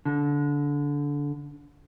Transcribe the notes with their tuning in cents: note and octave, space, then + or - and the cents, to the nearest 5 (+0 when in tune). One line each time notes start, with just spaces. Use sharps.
D3 -20